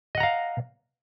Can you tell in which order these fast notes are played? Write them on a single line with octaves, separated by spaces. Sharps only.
D#5 F#5 A#5 F5